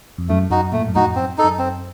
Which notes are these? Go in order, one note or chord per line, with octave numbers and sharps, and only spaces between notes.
F2
F#2 A3
F#2 D#4 F#4
A#2 A3
A2
F#2
F2 A2 D#4 F#4
F#2 C4
D#4 A4
F#2
C4